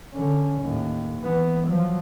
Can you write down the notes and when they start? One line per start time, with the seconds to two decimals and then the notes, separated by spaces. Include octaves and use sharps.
0.14 D3 C#4
0.62 D#2 A2
1.20 E3 B3
1.68 F3 F#3